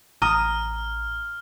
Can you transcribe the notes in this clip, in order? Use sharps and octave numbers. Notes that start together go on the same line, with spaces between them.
A1 A#5 D#6 F6